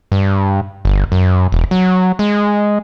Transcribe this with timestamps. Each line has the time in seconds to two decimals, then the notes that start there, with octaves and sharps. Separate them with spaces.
0.12 G2
0.85 G1
1.12 F#2
1.52 E1
1.71 F#3
2.19 G#3